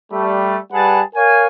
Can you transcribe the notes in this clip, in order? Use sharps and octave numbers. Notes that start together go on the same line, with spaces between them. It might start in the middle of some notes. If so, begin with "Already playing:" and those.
G3 A3
G3 G#4 B4 F#5 A5
A#4 C#5 F5 G#5